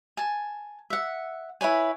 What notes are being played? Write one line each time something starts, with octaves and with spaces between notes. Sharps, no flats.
G#5 A5
E5 F#5
E4 B4 C#5 G#5